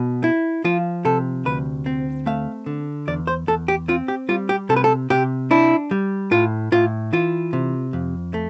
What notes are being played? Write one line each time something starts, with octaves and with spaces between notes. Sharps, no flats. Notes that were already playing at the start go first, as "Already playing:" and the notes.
Already playing: B2
E4
F3 F4
C3 A4
D2 B4
C4
A3 F5
D3
E2 D5
C5
E2 A4
G4
C4 F4
G4
G3 F4
G4
C3 A4
B4
A4
C3 G4
D4 E4
G3
A2 F4
A2 F4
E3 F4
C3
F2
A3